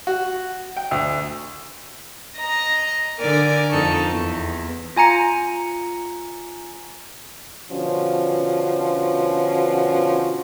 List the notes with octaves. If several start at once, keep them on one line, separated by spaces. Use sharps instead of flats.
F#4
G5
D2
D#5 A#5
D3 A#4 D5 G#5
F2 D#4 A4 C#6
E2
F4 G#5 A#5 C#7
B2 D3 F3 C#4 F#4